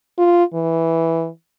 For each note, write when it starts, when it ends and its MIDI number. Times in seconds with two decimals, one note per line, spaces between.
0.18 0.44 65
0.53 1.28 52